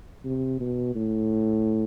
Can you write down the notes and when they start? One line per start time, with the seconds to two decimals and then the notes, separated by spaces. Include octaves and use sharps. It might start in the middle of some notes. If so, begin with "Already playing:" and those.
0.25 C3
0.60 B2
0.95 A2